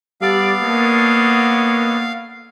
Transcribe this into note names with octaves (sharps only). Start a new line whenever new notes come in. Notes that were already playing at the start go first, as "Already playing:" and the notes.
G3 B3 A4 D5 F5
A#3 D4 C#5 D#5